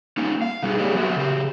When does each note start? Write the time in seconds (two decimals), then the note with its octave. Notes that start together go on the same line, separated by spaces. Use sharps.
0.17 A#3 C#4 D#4
0.42 F5
0.63 B2 G3 D#4 G#4
0.79 G3 A#3 G4 G#4 C#5 D#5
0.95 F#3 B3 F#4 A#4 E5
1.16 C#3 G4